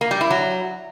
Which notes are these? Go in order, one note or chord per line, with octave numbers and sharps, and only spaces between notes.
A#3
G3
E4
F#3